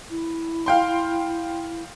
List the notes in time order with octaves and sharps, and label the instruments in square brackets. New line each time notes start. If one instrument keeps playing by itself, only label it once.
[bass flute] E4
[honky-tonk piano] F5 G5 C6